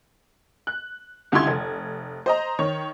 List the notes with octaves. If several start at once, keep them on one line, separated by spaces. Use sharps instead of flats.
F#6
C#2 D3 G3 E4 C6 G#6
F1
C5 D#5 A#5
D#3 C#5